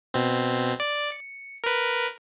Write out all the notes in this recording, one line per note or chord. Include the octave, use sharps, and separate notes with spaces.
B2 C4
D5
C#7
A#4 B4